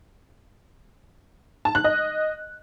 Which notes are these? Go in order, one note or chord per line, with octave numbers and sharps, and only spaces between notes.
A5
F#6
D#5